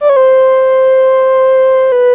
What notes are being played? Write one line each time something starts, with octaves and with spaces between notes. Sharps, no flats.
D5
C#5
C5
B4